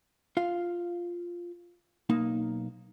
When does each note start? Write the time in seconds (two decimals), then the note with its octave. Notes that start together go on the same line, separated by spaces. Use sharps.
0.37 F4 F5
2.10 B1 A#3 D#4